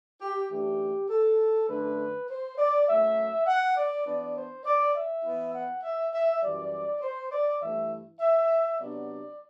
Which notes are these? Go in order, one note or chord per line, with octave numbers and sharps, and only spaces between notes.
G4
F#2 E3 A3 D4 G4
A4
F#2 D3 A3 D4 B4
C5
D5
F#2 F#3 A3 E5
F#5
D5
E3 B3 D4 D5
C5
D5
E5
E3 B3 E4
F#5
E5
E5
F#2 E3 G3 D5
C5
D5
G2 E3 A3 E4 E5
E5
C3 F#3 B3 D4 D5